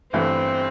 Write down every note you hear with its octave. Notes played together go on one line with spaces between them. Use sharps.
G1 G2 E3 A3 C4